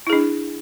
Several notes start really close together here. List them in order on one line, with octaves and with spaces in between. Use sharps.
E4 G#4 D4